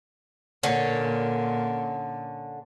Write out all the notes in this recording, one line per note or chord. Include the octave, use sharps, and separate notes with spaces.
A#2 D3 C#4